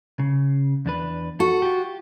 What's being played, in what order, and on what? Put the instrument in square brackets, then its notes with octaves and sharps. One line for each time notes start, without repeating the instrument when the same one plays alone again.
[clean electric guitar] C#3
E2 D4 B4
[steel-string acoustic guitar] F#4 [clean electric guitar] A4
[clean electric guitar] F4 G4